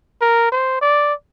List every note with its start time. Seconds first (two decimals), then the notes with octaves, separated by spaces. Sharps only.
0.21 A#4
0.52 C5
0.81 D5